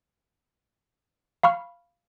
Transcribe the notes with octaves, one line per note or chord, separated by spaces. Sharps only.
F5 B5 C#6 F6